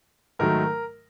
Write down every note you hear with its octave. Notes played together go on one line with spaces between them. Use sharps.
G#2 D#3 F#3 A3 A#4